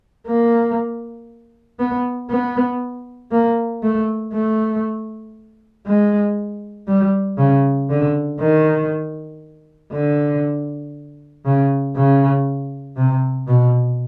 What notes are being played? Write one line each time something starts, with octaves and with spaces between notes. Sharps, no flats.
A#3
B3
B3
A#3
A3
A3
G#3
G3
C#3
D3
D#3
D3
C#3
C#3
C3
B2